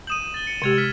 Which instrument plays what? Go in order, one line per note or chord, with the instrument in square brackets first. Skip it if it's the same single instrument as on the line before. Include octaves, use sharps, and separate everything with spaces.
[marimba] D#6 G6 [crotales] D#7 E7 F#7
[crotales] A6 G7
C#7
[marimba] C3 G#3 G4 [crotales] E6 G#6 C#7
[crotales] F6 B6